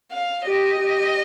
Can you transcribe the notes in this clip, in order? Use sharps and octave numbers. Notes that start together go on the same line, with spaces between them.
F5
G4 D#5
G4